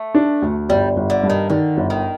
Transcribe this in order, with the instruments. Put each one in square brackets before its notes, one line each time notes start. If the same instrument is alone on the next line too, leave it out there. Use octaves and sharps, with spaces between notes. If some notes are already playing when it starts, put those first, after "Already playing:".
Already playing: [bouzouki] A3
[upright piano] D4
D2
[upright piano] G1 [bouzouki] G3
[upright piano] G1
[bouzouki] D3
[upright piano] G2
[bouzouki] D#3
[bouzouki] D3 [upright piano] D#3
[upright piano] G1
[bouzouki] D#3